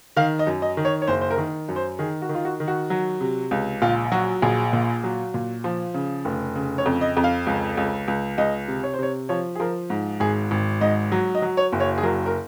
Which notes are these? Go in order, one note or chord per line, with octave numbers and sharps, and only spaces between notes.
D#3 F5
D#5
F#2
D#5
D#3
C#5
C#5
F#1 C5
C5
A#4
D#3
F#2
C5
D#3 G#4
F#4
D#3
F4
F#4
D#3
F#4
F#3
C3
C#2
A#1 F4
F#3 F#4
A#1 G#4
A#2
F#3
A#2
F3
C#3
F1
C#3
C#5
F2
D#5
F2
F5
C#2
C#2
C#2
C#2 D#5
C3
C#5
C5
C3 C#5
F3 C#5
G#4
F3 A#4
G#2
G#1 G#4
G#1
G#2 D#5
F#3
D#5
F#3
C#5
F#1
C#5
G#4
F#3 A#4
A#4